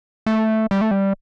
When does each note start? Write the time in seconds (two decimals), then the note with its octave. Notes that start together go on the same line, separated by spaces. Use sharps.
0.26 A3
0.71 G3
0.81 A3
0.91 G3